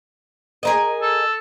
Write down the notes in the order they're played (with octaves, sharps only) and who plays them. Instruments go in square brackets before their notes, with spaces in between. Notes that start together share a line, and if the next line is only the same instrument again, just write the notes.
[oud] G#4 A#4 D#5
[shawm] A4